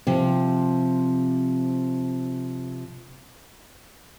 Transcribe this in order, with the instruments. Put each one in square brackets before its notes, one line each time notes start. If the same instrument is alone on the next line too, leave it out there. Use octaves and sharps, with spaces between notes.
[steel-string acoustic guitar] C3 F3